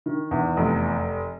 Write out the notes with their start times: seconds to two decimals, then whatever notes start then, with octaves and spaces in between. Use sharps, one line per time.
0.06 D#3
0.31 E2
0.57 F1